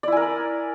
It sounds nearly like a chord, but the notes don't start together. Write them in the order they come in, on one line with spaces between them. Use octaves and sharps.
D5 E4 G#5 A#4